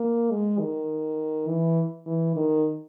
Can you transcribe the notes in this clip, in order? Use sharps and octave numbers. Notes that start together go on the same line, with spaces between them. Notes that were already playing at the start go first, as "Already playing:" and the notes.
Already playing: A#3
G#3
D#3
E3
E3
D#3